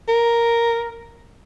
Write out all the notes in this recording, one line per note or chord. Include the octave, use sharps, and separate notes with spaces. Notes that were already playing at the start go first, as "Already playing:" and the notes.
A#4